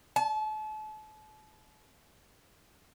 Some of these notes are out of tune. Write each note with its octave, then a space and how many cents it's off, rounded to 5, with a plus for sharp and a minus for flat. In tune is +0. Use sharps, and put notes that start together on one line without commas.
A5 -35